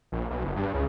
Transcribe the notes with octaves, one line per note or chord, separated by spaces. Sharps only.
A#1
B1
F#1
G2
C#2